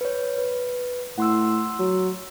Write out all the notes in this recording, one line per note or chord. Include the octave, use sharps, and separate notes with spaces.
B4 C#5
B4
A2 F#5 C6 E6
F#3